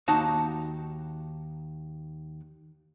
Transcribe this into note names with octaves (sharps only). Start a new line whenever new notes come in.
D#2 D#4 F#4 A5 A#5